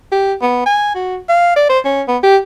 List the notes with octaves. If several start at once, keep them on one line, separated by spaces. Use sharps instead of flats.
G4
B3
G#5
F#4
F5
D5
C5
C#4
B3
G4